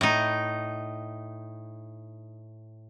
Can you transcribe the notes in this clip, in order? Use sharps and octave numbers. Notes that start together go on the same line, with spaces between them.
A2 D#4